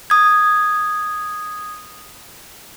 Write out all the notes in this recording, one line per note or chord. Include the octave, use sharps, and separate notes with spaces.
D#6 G#6